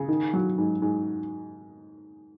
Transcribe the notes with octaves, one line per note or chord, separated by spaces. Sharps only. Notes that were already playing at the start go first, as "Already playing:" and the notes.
Already playing: C#3
D#3
F#3
G#2
G#2